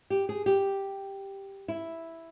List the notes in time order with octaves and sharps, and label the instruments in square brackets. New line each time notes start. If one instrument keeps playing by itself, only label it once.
[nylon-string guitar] G4
G#4
G4
E4